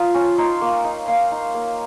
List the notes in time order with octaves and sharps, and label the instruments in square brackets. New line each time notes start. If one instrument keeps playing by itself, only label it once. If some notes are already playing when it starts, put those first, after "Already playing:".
Already playing: [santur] F3 F4 A#5 D#6
C#4
D#4 C6
A#3
D#4
A#3 F5
D#4
A#3